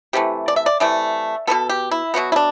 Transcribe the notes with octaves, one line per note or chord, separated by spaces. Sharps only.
C3 E3 A3 G4
D5
E5
D5
C3 E3 A3 D5
B2 F#3 B3 A4
G4
E4
B2 F#3 B3 F#4
E4
D4